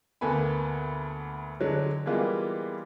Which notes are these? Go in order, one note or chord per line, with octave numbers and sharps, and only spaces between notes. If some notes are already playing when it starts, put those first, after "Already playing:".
D2 A#3 B3 A4 G#5 B5
D3 F#3 G#3
E3 G3 G#3 A#3 B3 F4